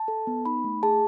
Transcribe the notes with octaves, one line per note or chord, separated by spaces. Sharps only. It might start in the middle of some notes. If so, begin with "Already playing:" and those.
Already playing: A5
A4
B3
D#4 B5
A3
G#4 A5